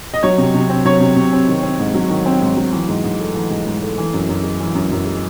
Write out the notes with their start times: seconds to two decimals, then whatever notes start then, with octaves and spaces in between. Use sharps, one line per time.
0.14 D#5
0.23 F#3 C#5
0.38 C3
0.54 C3
0.70 C4
0.85 F#3 C#5
1.00 C3
1.16 C3
1.33 C4
1.48 D#3
1.63 C4
1.80 G#2
1.94 F#3
2.10 D#3
2.26 C4
2.42 G#2
2.57 F#3
2.72 E3
2.88 G#2
3.04 G#2
3.20 A3
3.35 E3
3.50 G#2
3.67 G#2
3.82 A3
3.98 E3
4.14 F#2
4.29 F#2
4.44 G#3
4.60 E3
4.75 F#2
4.91 F#2
5.06 G#3